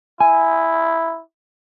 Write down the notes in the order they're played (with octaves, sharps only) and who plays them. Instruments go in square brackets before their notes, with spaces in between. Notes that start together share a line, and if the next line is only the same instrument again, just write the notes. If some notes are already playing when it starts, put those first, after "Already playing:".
[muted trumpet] E4 [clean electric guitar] G#5